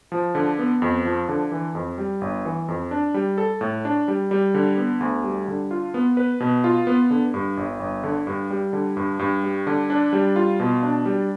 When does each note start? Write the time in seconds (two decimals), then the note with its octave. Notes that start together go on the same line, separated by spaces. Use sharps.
0.12 F3
0.35 D3
0.59 B3
0.82 F2
1.05 F3
1.29 D3
1.52 E3
1.75 F2
1.98 G3
2.21 G1
2.45 E3
2.68 F2
2.91 D4
3.14 G3
3.38 A4
3.61 A2
3.85 D4
4.08 G3
4.31 G3
4.54 D3
4.77 B3
5.00 D2
5.24 G3
5.48 D3
5.71 F4
5.94 B3
6.17 B4
6.40 B2
6.64 F4
6.87 B3
7.10 D3
7.34 G2
7.57 G1
7.80 G1
8.04 D3
8.27 G2
8.50 G3
8.73 D3
8.97 G2
9.19 G2
9.44 G3
9.67 D3
9.90 D4
10.13 G3
10.36 F4
10.60 B2
10.83 D4
11.05 G3